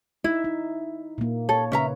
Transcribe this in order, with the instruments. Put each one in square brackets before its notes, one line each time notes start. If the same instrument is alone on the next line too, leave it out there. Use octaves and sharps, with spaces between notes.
[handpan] D#4 E5 [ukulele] E4
[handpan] D#4
A#2 A#3
[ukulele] A4 [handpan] C#5
[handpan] C#3 B4 [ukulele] C#4 E5 A#5